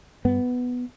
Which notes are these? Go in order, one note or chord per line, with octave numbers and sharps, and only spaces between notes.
G2 B3